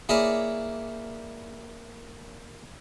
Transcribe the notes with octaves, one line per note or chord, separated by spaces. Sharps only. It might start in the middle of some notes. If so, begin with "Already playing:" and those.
A#3 E4 G#4 A#4 C#5 D5